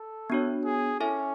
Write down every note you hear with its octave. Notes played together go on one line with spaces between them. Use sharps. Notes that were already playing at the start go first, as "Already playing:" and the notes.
Already playing: A4
B3 D4 F#4 C#5
G#4
C#4 E4 A4 E5 G#5